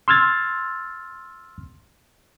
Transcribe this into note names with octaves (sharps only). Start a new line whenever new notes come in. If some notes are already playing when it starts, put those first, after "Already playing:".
C6 E6 F6 G#6 A6